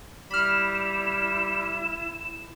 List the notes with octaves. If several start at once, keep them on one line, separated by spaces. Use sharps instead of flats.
G3 E4 B5 F6 E7